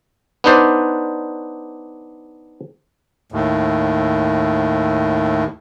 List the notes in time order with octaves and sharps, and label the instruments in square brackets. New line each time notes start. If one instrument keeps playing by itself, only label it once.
[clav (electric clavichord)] B3 D4 D#4 B4 C5 D5
[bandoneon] D#2 A2